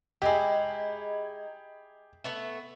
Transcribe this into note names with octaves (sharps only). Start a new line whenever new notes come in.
G#3 D#4 E4 G4 G#4
A3 B3 E5